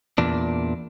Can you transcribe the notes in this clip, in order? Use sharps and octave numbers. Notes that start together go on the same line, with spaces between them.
E2 A#2 D4